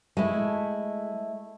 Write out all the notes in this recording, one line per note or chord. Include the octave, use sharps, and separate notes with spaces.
G#3 A3 E4